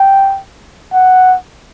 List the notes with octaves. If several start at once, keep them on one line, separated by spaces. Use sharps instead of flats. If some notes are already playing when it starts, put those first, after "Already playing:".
Already playing: G5
F#5